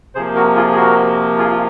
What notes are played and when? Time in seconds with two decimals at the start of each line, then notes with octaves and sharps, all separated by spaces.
0.15 C3 F3 A#3 G#4 C5
0.35 F#4 A#4
0.56 F4 G#4
0.71 G#4
0.76 F#4 A#4
1.38 F4 G#4
1.51 F4